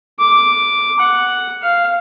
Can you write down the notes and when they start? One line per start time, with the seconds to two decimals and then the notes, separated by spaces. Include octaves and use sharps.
0.19 D6
0.99 F#5
1.62 F5